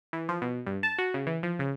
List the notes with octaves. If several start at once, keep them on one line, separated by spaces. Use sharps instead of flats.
E3
F3
B2
G2
A5
F#4
C#3
E3
F3
C#3